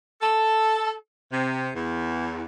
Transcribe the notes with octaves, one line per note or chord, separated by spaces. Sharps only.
A4
C3
E2